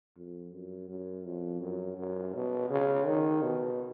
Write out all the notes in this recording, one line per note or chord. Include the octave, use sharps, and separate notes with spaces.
F2
F#2
F#2
F2
F#2
F#2
B2
C#3
D#3
B2